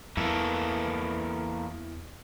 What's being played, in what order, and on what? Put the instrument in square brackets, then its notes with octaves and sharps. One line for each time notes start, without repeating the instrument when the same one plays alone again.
[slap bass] E2 [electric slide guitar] E3 A#3 A4